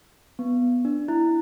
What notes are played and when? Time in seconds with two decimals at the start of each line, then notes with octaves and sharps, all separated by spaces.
0.39 B3
0.85 D4
1.08 E4